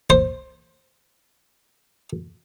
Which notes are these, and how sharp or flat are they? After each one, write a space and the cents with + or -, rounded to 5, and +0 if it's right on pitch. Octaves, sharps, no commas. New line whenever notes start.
C5 +10